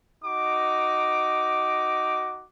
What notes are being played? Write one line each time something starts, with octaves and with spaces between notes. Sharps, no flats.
D#4 F#4 D6